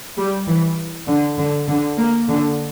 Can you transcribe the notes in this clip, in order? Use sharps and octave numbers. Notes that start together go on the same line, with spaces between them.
G3
E3
D3
D3
D3
A#3
D3